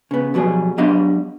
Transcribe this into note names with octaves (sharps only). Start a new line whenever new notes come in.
C#3 B3
F2 B2 F#3 G3 G#4
F#3 G3 B3 D4 D#5 F5